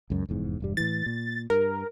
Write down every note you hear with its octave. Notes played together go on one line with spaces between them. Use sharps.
C#2 F#2
F1 E2 G#2
E1 G2 G3
A2 E3 A6
A#2
G2 A#4